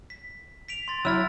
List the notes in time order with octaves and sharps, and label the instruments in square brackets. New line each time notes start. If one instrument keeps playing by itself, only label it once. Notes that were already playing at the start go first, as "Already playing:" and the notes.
[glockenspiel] B6
B6 D7 F7
C6 A6
[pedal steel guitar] F#3 E4 [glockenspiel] E6 F6 A6